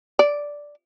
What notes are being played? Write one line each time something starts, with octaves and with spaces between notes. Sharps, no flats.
D5